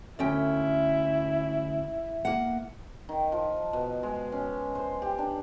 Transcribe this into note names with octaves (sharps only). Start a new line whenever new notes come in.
D2 C#4 E4 G5
A#3 F#5
D#3
F3
B2
G#3
C#4
C5
G4
D4